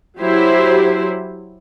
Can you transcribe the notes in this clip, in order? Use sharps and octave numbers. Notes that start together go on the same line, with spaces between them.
F#3 E4 G4 C5